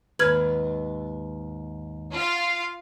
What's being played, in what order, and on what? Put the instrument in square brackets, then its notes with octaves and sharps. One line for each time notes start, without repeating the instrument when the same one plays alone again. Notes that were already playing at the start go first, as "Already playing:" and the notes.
[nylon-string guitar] D#2 G#2 B4 [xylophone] F6 G#6 F#7
[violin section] F4 F5